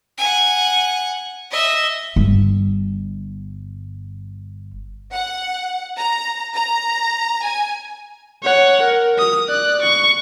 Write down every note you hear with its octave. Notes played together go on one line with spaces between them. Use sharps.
F#5 G#5
D#5 E5
G1 G3
F#5
A#5
A#5
G#5
C#5 F#5
A#4
D#6
D5 F#6
C#6